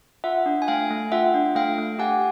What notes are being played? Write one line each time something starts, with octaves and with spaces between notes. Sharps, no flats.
F4 E5 F#5
D4
G#5
A3 F5 G5
A3
F4 E5 F#5
D4
A3 F5 G5
A3
G4 F#5 G#5